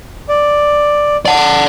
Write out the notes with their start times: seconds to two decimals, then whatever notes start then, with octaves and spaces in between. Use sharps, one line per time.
0.29 D5
1.26 D5 F#5